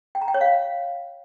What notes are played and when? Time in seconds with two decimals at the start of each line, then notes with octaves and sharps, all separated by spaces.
0.15 G5
0.21 A#5
0.28 G5
0.34 C#5
0.41 F5